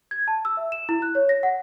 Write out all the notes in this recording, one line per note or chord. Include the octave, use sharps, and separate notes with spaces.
G#6
A5
E6
E5
E7
E4
F#6
C#5
A#6
F#5